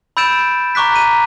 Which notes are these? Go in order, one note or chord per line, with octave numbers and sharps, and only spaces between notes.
B5 E6 G6 A6 D7 E7
A#5 C#6 D6 F#6 B6
A#5 D#7